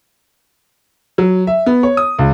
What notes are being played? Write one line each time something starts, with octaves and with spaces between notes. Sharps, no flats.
F#3
E5
B3
C#5
D#6
C#2